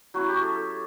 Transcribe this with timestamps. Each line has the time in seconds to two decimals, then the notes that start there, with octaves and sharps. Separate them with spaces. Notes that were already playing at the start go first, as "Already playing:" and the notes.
0.14 F#3 C#4 E4 F#4
0.28 G4
0.42 A4
0.55 A4